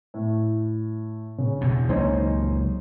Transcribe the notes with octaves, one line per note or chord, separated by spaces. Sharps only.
A2
C#3
E2 B2
C#2 F#3 A#3 C#4 D#4 C5